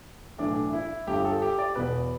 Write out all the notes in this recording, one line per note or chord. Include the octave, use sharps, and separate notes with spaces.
B1 A2 E3 D4
E4
G1 G2 D3 G4
A4
G4
D5
E1 E2 B2 B4